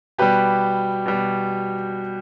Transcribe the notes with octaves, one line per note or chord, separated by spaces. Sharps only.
B2 G3 G4 B4
B2 G3